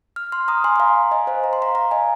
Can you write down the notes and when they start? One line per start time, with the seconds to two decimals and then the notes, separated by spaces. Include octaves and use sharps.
0.16 F6
0.32 C6 F6
0.48 A#5 D#6
0.64 G#5 C6
0.76 C6
0.80 F5 A#5
1.11 D#5 G#5
1.27 C5 F5
1.44 A#5
1.53 C6
1.62 F5 A#5
1.75 F5 A#5
1.91 D#5 G#5